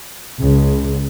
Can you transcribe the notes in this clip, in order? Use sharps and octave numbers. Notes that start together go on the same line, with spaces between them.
C#2 C#3